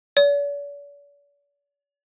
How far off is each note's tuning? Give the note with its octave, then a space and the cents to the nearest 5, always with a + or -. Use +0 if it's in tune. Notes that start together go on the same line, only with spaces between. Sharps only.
D5 -45